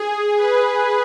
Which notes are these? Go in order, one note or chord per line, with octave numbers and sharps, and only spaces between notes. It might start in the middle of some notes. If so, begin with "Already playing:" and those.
Already playing: G#4
B4